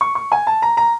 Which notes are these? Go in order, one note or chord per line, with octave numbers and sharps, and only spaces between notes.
C#6
C#6
G#5
A5
A#5
A#5